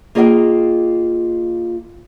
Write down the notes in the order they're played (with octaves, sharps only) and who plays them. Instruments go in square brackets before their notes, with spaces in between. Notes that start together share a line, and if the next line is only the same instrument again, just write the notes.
[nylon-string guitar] A#3 F4 G#4 D#5 E5 G5